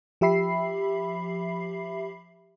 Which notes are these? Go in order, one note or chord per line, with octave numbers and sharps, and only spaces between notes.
F3 G4 E5 B5 C7